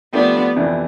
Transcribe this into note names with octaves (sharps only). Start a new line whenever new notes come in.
F3 A3 B3 C4 D4 G4
F2 C3 E3 B3 D4